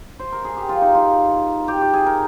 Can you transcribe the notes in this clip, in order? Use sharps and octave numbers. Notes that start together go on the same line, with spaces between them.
C5
A#4
G#4
G4
F4
D#4
F4
G4
G4
G#4
A#4